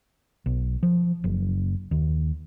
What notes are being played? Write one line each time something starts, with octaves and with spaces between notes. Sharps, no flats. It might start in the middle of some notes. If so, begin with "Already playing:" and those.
B1
F3
F#1
D#2